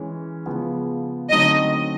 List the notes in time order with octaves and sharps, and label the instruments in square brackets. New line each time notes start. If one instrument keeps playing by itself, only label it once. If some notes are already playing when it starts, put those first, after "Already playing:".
Already playing: [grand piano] E3 G#3 C#4
C#3 F3 G#3 B3
[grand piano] D3 F#3 A3 C4 D#4 [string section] D#5